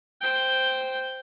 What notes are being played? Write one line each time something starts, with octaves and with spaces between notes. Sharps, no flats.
C5 G5